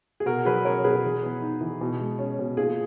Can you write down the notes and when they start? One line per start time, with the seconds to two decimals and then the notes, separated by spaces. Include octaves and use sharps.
0.20 G#4
0.26 B2 F#4 A#4
0.45 F#3 G#4 B4
0.65 C#4 A#4 C#5
0.84 B2 G#4 B4
1.04 E3
1.23 B3
1.42 D#4
1.61 E3
1.81 B2
2.00 G#3
2.19 C#4
2.39 B2
2.57 A#2 G#4